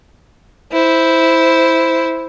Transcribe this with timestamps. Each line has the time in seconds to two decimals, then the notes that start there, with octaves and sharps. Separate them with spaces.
0.72 E4 C5